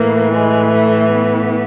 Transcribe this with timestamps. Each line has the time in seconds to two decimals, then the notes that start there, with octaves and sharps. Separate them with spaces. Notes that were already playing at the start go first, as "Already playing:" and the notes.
Already playing: A2 E3 A#3
0.33 G#3
0.72 A3
1.11 B3